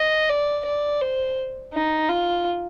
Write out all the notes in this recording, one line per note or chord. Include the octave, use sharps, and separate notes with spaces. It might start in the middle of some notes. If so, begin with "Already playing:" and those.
Already playing: D#5
D5
D5
C5
D#4
F4